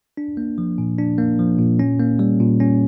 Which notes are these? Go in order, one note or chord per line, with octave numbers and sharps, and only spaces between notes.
D4
A#3
F3
A#2
D4
A#3
F3
A#2
C#4
A#3
G3
A#2
C#4